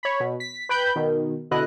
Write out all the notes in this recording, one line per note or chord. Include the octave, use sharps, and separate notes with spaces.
C#5 B5
B2
B6
B4 G5 B5 G6
B2 D#3
B2 D3 E4 D#5 F#6